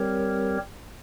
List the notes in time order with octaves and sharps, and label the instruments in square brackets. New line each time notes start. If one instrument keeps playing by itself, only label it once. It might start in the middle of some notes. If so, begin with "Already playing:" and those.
Already playing: [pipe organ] G3 C4 G4 A#4 C#5